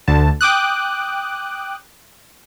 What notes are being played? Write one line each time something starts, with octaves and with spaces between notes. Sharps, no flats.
D2 D3 A5
G5 D6 D#6 F#6